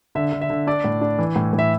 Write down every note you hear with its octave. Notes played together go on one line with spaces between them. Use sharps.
D3 E5
D3
E5
D3
D4 D5
A2
D4
E3
A2
A2
E5